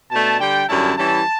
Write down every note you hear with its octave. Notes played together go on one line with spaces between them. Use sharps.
B2 A3 D4 A5
D3 G3 D4 G5
F#2 D3 G3 C#4 E4 A5
E3 G3 C#4 E4 A5